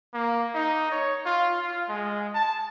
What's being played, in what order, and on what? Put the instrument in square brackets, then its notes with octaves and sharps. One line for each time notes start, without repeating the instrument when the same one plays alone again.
[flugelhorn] A#3
D#4
C#5
F4
F4
G#3
A5